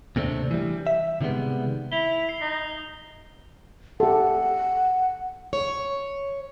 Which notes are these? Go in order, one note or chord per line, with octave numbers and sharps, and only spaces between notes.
D#2 C3 A3 C4 D4
E3 G3
E5
C3 D#3 G3 G#3 B3
E4 F7 G7
C7
D#4
G4 A4 F#5
C#5